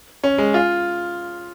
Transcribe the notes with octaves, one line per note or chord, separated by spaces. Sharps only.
C#4
G#3
F4